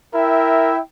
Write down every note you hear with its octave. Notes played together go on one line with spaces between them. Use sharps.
E4 A#4 E5 G5